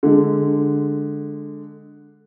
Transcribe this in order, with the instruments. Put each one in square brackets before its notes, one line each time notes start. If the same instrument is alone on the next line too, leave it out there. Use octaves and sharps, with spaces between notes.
[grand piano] D3 G#3